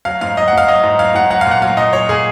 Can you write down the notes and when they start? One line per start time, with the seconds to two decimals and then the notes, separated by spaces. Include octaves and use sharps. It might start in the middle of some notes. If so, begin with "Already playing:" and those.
0.05 F#3 F5
0.21 G#2 F5
0.37 F#3 D#5
0.48 F#5
0.53 G#2 F5
0.68 F#3 D#5
0.83 G#2
0.99 F#3 F5
1.15 G#2 F#5
1.30 F#3 F#5
1.41 A#2 F5
1.51 F#5
1.62 F#3 F5
1.77 A#2 D#5
1.93 F#3 C#5
2.09 A#2 G#4